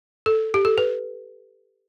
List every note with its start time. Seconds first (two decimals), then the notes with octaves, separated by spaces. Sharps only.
0.26 A4
0.54 G4
0.65 A4
0.78 B4